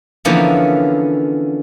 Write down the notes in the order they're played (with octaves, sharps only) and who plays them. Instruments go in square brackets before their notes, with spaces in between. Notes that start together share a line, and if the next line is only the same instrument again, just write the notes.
[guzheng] D3 E3 F3 A#3 B3 C#4